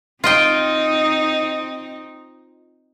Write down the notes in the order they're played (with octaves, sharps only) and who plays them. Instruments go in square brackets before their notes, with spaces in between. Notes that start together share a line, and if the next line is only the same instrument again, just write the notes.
[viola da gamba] C4 D#4 [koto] F4 D#5 G5